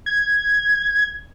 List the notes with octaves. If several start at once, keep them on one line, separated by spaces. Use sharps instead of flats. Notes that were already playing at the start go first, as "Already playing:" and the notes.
G#6